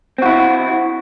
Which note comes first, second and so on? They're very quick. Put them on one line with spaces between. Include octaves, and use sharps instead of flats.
C4 F#4 E4